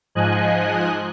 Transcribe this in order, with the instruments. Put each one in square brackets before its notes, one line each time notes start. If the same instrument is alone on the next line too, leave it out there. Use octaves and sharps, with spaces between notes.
[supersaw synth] G#2 F3 D#5 G#5 F#6